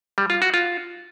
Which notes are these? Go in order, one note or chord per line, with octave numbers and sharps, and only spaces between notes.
G3
F4
F#4
F4